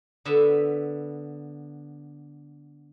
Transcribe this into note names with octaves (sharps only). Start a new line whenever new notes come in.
D3 B3 E5